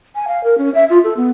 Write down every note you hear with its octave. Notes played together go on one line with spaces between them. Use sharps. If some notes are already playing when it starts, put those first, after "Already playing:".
G#5
F5
A#4
C#4
E5
F4
A4
B3